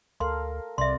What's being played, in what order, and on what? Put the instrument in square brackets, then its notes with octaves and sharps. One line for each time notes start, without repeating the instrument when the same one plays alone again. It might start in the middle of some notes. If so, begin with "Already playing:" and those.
[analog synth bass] D2 [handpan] A4 A#4 F5 [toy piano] C6
[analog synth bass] C2 [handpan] C3 [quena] D5 [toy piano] E5 C6